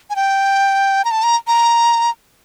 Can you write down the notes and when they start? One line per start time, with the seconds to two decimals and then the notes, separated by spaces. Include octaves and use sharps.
0.10 G#5
0.16 G5
1.05 A#5
1.11 A5
1.23 A#5
1.47 A#5